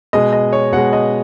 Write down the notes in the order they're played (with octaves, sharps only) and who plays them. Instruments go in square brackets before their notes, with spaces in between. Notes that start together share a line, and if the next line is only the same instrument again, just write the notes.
[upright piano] B2 G#3 D#5
D#5
C#5
B2 G#3 F#5
D#5